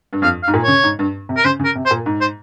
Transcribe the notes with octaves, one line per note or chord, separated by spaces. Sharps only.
G2
F2 F5
F5
G#2
A#2
C#3 C#5
G#2
G2
C3
A#4
C#3 C5
C#3
A#4
C3
C5
A#2
G#2
C5